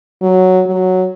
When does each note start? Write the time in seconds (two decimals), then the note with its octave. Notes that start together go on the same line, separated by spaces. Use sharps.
0.22 F#3
0.66 F#3